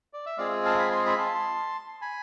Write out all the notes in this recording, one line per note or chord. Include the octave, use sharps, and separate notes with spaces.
D5
E5
G#3 C4 F4 G#4 D5 F5
F5 A5
G#5 B5
C6
B5
A5 C6
G#5 B5